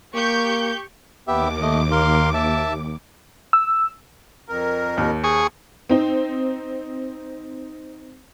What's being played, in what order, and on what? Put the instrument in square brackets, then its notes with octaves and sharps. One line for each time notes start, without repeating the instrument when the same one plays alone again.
[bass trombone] A#3 [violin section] G4 C#6 G6
[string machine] D#2 D6 [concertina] B3 G4 E5
[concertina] A3 D#5
A#4 F5 C6
E5 A5
[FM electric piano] E6
[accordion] F2 A#4
[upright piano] D#2
[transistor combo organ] G#4 C#6
[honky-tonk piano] C4 D#4